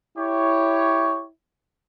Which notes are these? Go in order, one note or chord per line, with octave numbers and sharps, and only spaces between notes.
E4 G4 C#5